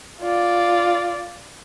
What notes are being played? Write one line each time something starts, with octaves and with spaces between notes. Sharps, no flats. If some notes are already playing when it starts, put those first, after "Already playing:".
F4 D5